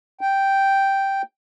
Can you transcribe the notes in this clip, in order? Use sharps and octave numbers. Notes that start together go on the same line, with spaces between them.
G5